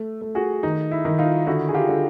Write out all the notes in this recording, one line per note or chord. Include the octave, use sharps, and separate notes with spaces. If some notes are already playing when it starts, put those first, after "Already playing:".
Already playing: A3
A3
F#4 G#4
D#3 D#4
E4
D#3
D#4 F4
D3 E4 F#4
G#4
F4 G4
D3